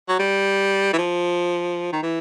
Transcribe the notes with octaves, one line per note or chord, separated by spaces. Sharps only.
F#3
G3
E3
F3
D#3
E3